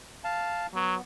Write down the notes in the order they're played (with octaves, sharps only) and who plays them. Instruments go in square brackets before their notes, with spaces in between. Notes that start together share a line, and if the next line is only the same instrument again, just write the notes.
[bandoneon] F5 A5
[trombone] F#3 [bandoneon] B3